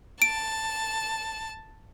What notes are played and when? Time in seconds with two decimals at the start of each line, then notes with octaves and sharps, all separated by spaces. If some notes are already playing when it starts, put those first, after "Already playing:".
0.22 A5 D7